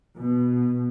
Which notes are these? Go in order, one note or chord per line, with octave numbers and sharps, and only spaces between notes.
B2